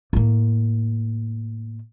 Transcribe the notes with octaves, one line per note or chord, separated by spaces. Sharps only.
A2 A#3